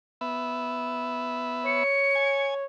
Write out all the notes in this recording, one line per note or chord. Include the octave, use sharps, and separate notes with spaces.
B3 E5
C#5 C#7
G#5